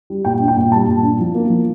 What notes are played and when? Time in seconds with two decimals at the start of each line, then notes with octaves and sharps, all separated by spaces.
0.10 G3
0.25 A#2 G5
0.40 D4
0.48 G5
0.57 A#2
0.72 G3 A5
0.88 A#2
1.03 D4
1.19 F3
1.35 A#3
1.50 F3